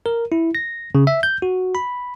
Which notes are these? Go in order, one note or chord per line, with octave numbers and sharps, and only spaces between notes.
A#4
E4
A#6
C#3
E5
G6
F#4
B5